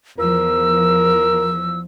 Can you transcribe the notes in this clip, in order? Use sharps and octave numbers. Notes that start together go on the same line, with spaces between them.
E2 F3 A#4 E6